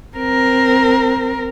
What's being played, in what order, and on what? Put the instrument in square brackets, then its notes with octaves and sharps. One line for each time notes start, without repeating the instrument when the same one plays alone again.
[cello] C4 A#4